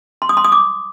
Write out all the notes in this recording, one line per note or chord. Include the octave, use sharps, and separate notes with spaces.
C6
D#6
C6
D#6
D6